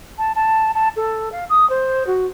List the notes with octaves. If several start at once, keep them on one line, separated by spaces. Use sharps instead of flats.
A5
A5
A5
A4
F5
D#6
C5
F#4